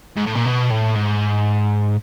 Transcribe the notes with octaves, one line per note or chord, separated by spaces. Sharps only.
G#2
A2
A#2
B2
A2
G#2